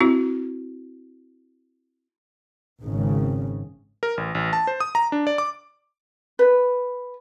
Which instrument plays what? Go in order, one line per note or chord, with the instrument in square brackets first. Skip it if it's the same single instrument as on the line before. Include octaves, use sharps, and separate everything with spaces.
[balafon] C4 E4 F#4
[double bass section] G#1 C#3
[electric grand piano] A#4
A1
A1
A5
C5
D#6
A#5
D4
D5
D6
[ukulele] B4